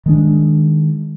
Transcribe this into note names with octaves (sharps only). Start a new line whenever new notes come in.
D#3 G#3 D4